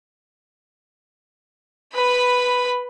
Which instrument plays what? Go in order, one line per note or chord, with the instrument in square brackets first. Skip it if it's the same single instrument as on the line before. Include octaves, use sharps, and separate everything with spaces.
[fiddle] B4 B5